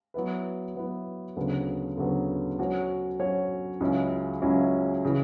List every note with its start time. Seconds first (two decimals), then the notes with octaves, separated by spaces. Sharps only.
0.14 F#3 B3 E4 B4
0.75 F#3 B3 E4 B4
1.36 D2 C#3 F#3 B3
1.97 D2 C#3 F#3 B3
2.59 F#3 C#4 F#4 C#5
3.19 F#3 C#4 F#4 C#5
3.80 C#2 C#3 F#3 C#4 E4
4.42 C#2 C#3 F#3 C#4 E4
5.05 C#3 E3